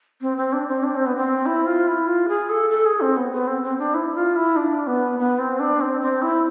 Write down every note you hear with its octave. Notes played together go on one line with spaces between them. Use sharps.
C4
C4
D4
C4
D4
C4
B3
C4
E4
F4
E4
F4
G#4
A4
A4
G#4
C4
B3
B3
C4
C4
D4
E4
F4
E4
D4
B3
B3
C4
D4
C4
C4
E4